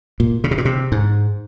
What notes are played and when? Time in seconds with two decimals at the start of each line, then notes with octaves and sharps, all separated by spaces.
0.20 A#2
0.44 C#3
0.51 C3
0.58 A#2
0.65 C3
0.92 G#2